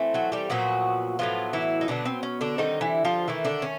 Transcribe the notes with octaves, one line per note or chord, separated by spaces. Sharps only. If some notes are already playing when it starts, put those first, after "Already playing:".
Already playing: E3 A3 C4
F#3 F#4
G3 G4
A#2 F3 F#3 B3 F#4
A2 F3 F#3 B3 F4
E3 E4
D#4
B2 D3 F#3 B3 D4
C4
C#4
D3 D4
D3 D#3 G3 C4 D#4
E3 E4
F3 F4
D#3 E3 A3 E4
D3 D4
C#4